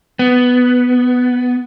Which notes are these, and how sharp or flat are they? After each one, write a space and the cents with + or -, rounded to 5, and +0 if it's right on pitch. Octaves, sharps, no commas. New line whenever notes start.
B3 +5